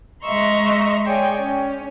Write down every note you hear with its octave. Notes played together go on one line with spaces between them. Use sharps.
G#3 D#5 E5 A#5 C6 C#6
G#4 C#5 D5 G5 G#5
C#4